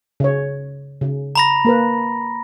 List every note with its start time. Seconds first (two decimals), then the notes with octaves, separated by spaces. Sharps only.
0.20 C#3 C#5
1.01 C#3
1.35 A#5 B5 A#6
1.65 A#3 A#4 B4